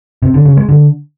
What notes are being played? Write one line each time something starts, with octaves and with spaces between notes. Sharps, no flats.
C3
D3
C#3
G#3
D3